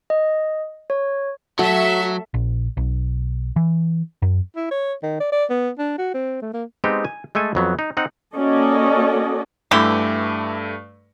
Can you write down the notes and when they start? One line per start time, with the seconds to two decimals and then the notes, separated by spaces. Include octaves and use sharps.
0.10 D#5
0.90 C#5
1.59 F#3 A3 F#4 A4 E5
2.34 A#1
2.77 B1
3.56 E3
4.22 F#2
4.56 E4
4.71 C#5
5.03 D#3
5.20 D5
5.32 D5
5.50 B3
5.78 D4
5.99 F#4
6.14 C4
6.42 A3
6.54 A#3
6.84 G#3 B3 C4 D#4 G4
7.05 G#5
7.35 G#3 A3 A4 G#5
7.55 F2 F#3 B3
7.79 D#4
7.97 C4 D#4 F#5
8.34 A#3 C#4 F#4 A4 D5 D#5
9.71 G2 D3 E3 A3 G4